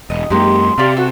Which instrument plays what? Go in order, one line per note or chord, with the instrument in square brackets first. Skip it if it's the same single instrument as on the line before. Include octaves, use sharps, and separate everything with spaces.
[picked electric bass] E1 [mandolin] D#5
[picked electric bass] F#2 G#3 A#3 [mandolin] D#4 G4 [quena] C6
[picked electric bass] C3 [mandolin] G4 D5 F5
[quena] F#4 [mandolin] A4 C5